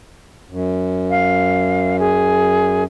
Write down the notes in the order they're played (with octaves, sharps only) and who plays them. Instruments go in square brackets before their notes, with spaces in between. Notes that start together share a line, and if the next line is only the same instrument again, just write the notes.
[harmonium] F#2
[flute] F5
G#4